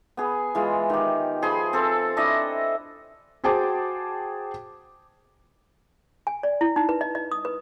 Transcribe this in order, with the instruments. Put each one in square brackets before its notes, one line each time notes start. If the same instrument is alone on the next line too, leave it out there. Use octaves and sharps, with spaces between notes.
[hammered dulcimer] B3 G#4
E3 G#3 F4
D#3 G4
F3 G#4 B5 C6
C4 A4
D4 E4 D#5 E5
[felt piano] F#4 G#4 C5 G5 A5 D6
[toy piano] G#5
D5
E4
D#4
B4
D#5
D#5
D#6
B4